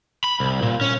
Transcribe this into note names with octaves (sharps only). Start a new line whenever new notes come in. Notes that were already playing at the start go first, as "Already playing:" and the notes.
B5
C2
A#2
C#4